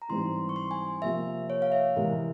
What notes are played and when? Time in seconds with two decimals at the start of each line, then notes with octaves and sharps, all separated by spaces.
0.02 A#5
0.09 G#2 E3 G3 C4 C6
0.49 C#6
0.56 C6
0.71 G#5
1.02 C3 F3 A#3 E5
1.50 C#5
1.62 F5
1.72 E5
1.96 C3 E3 G#3 E4 A#4